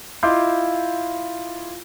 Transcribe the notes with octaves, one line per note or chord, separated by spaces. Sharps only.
E4 F4 D#5 C6 D6 G6